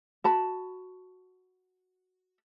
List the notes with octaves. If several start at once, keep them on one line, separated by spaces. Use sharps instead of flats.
F#4 A5 B5